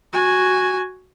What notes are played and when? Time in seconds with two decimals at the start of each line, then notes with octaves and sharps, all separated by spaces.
0.13 F#4 G#5